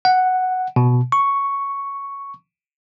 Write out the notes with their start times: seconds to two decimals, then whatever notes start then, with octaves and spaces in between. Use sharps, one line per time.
0.05 F#5
0.76 B2
1.12 C#6